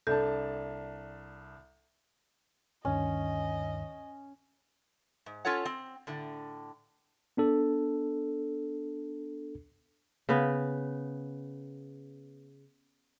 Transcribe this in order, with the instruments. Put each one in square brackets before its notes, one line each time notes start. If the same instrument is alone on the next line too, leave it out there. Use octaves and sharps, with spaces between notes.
[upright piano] C2 D4 A5 [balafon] A4
[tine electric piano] D2 G2 D#3 [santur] C#4 [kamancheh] D#5
[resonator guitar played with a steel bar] G#2
C#4 F4 A4 C#5 F#5
C4
A2 D3
[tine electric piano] B3 D4 A4
[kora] C#3 B3